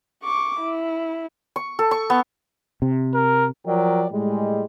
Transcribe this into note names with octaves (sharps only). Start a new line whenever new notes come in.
C#6 D6
E4
C#6
A4
C#6
B3
C3
A#4
F3 F#3 A#4 D5 G5
A2 G3 G#3